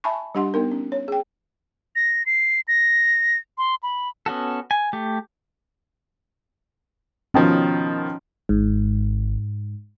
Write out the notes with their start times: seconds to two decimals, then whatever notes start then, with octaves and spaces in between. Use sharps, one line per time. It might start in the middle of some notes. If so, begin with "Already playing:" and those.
0.04 E5 G#5 A5 B5 C#6
0.35 G3 D4 G4 F#5 C6
0.54 B3 D#4 A#4
0.72 C#4
0.92 C#5
1.08 G#4 G5
1.96 A#6
2.26 C7
2.68 A#6
3.58 C6
3.83 B5
4.26 B3 C#4 F#4 A4
4.71 G#5
4.93 A3 G4
7.34 B2 D#3 F3 C#4
8.49 G#1 G#2